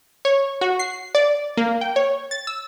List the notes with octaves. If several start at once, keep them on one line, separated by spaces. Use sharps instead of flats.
C#5
F#4
C7
D5
A#3
G5
C#5
A6
E6